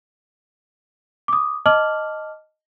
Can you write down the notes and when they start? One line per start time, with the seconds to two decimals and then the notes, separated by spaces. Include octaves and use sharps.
1.28 D6 D#6
1.66 D#5 A5 D6 F6 F#7